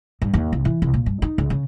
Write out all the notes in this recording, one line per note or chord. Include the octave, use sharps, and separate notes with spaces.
G2
D#2
C2
E3
C2
A#2
G2
D#4
C#2
C#3